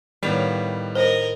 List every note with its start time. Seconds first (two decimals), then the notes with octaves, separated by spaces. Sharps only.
0.23 A2 D#3 G3 B3 F5
0.95 A#4 C5 D#5